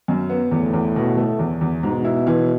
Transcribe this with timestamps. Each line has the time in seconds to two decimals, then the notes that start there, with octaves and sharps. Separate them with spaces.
0.08 F#2
0.29 B3
0.51 E2 A2
0.73 E2
0.96 B2
1.17 A3
1.39 E2
1.61 E2
1.83 G#2 B2
2.05 E4
2.27 E3